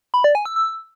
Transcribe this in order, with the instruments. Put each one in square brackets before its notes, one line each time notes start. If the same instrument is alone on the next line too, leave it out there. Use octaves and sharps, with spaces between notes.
[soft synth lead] B5
D5
G#5
E6
E6